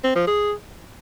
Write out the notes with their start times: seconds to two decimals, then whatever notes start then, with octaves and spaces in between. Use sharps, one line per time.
0.04 C4
0.16 F3
0.27 G#4